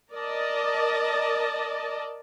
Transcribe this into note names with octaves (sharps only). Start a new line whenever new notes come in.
A#4 D5 D#5 A5